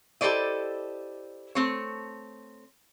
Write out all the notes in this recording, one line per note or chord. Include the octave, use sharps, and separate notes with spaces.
E4 G4 A4 C5 D5 D#5
A3 C4 C#5